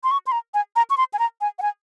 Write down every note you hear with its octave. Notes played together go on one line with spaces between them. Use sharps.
C6
C#6
C6
A#5
G#5
A#5
C#6
C6
G#5
A#5
G#5
F#5
G#5